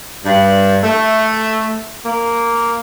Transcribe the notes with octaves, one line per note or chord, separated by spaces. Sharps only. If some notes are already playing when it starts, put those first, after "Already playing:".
G2
A3
A#3